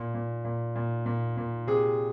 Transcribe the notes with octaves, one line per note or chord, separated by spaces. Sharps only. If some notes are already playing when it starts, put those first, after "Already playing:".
Already playing: A#2
A#2
A#2
A#2
A#2
A#2
C3 G#4